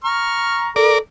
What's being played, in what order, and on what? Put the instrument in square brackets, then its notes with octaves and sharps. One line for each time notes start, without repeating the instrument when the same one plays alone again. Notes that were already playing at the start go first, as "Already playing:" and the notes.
[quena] A#5 [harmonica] C#6 F6
[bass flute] A4 [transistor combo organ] A#4 D5